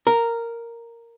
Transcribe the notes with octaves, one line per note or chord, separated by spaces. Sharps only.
A#4